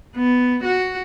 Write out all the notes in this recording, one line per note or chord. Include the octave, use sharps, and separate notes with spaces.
B3
F#4